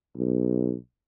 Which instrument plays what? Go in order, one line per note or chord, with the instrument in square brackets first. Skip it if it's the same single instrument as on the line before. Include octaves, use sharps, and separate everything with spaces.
[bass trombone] B1